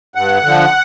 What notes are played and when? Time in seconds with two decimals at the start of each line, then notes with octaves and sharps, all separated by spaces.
0.15 G2 F#5
0.43 D3 F3